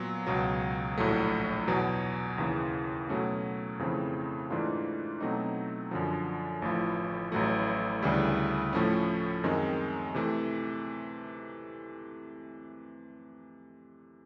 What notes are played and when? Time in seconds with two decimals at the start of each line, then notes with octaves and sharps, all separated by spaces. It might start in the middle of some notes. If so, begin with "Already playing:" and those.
Already playing: A#2 F#3 B3
0.26 C#2 B2 F#3
0.97 A#1 A2 F#3 A3
1.68 E2 B2 F#3 B3
2.38 D#2 C#3 E3
3.09 B2 F#3 A3 C#4
3.79 F2 C#3 E3 A3 C4
4.50 G#2 E3 A3 D4 F4
5.20 B2 F#3 A3 C4 D#4
5.91 F#2 D3 F3
6.62 A1 A2 F3
7.32 A1 A2 F#3 A3
8.02 D2 C#3 E3 G3
8.73 A2 F3 A3 C#4
9.44 F#2 D#3 G#3 C4
10.14 C3 E3 A3